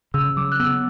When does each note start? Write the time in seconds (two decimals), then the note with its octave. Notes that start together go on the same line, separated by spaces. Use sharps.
0.14 C#3 E6
0.37 F#3 D6
0.52 F#6
0.60 B3 E6